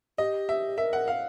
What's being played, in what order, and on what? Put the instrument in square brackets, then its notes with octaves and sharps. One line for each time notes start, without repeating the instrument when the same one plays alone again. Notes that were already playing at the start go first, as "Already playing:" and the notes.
[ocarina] G4 [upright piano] D#5
[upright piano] E5
[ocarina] A#4 [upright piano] E5
[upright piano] F#5
F5